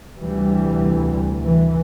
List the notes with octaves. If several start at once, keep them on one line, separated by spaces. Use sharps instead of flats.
D2 C3 E3 G3
E3